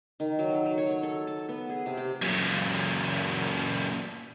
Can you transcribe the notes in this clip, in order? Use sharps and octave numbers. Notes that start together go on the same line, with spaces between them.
D#3
F#3
A4
F#3
C#5
C#5
A4
A5
B3
G#4
C3
G4
F#2 A#2